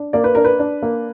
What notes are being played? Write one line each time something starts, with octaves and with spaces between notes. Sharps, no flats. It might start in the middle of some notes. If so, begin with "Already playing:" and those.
Already playing: D4
A#3 D5
B4
D4 A#4
B4
D4
A#3